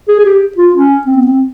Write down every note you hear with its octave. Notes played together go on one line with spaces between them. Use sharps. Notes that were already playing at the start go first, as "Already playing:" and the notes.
G#4
G#4
G4
F4
C#4
C4
B3
C4